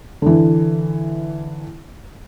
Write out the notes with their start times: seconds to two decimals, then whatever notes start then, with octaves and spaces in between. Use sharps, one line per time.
0.22 D3 E3